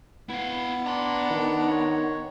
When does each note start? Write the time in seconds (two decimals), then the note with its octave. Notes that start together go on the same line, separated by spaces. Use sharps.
0.30 B3 E4 F5
0.86 D4 A#5 C6
1.31 D#3
1.69 C#5